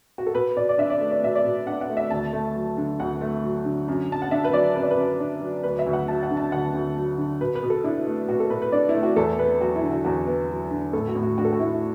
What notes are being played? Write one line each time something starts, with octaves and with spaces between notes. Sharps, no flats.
F#4
A4
B2 B4
B2 D5
D5
D4 E5
D5
A3
D5
B2 E5
D5
B2
D4 F#5
F#5
A3
E5
D2 A5
A3
F#3
D3
D2 F#5
A3
F#3
D3
F#2
F#2 A5
F#5
D4 E5
B4
F#3 D5
F#2 B4
D5
B4
F#2
D4
F#3
D2 B4
E5
D2
F#5
F#3 A5
F#5
D3
A5
D2 F#5
D2
F#3
D3
B2 B4
B4
B2
A4
D4 E4
A3
B2 F#4
A4
B2 B4
B4
D4 D5
E4
A3
F#4
E2 A4
B3 B4
F#3 F#4
E4
D3
F#4
E2 F#4
B3
F#3
D3
A2 A4
F#4
A2
F#4
D4 F#4
A4
F#4
A3 E4